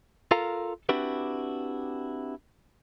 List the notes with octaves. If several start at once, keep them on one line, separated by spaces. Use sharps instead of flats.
F4 A4 A#4 F5 A#5
C4 D4 E4 F#4 G4 B4